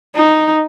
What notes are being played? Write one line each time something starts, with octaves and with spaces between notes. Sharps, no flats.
D#4